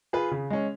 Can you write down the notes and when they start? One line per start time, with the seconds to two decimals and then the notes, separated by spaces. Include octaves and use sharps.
0.13 F4 G#4 B4
0.31 C#3
0.50 G#3 C#4